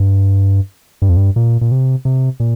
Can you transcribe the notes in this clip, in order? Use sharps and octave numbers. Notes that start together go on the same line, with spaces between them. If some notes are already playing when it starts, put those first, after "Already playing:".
Already playing: G2
G2
F2
G2
A#2
A#2
C3
C3
A#2